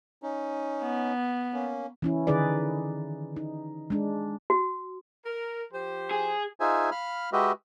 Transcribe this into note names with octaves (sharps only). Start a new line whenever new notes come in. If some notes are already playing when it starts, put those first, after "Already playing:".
C#4 D#4
B3
A#3 C#4
E3 C#4 E4
D3 D#3 D#4 G#4 B4 D5
D#4
G#3 D4
F#4
A#4
F3 G4 C5
G#4
D#4 F4 G#4 C5 E5 G#5
F5 B5 F6
G#3 F#4 G4 B4 D#5 E5